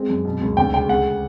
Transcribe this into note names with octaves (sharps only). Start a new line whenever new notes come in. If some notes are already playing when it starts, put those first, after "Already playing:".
Already playing: G#3 C4
F#2
B2
C#2
D2 G5
C#3 G5
G#3 F#5